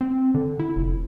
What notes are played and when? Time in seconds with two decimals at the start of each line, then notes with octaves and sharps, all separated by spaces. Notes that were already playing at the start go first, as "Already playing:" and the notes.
0.01 C4
0.34 D3
0.59 E4
0.76 F1